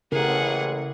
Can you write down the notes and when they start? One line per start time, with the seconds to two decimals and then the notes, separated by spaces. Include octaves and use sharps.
0.12 A1 C#3 E4 G#4 A#4 F#5